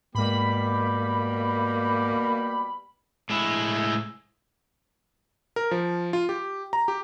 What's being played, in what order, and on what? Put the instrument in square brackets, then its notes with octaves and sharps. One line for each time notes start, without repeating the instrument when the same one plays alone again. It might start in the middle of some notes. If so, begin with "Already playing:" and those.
[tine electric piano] G#2 G#3 [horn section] B2 G3 G4 [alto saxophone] A#3 [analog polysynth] B5
[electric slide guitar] A2 G#3 E4
[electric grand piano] A#4
F3
F4
G4
A#5
G4